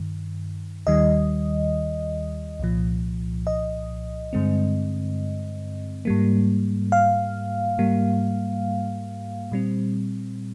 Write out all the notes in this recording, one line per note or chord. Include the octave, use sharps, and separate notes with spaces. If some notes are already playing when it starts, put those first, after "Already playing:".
Already playing: G2 D#3
D#2 D#3 G3 D#5
C2 A#2 F3
D#5
G2 D3 G#3 C4
G#2 G3 A#3
F5
G#2 G3 A#3
A#2 G3 C4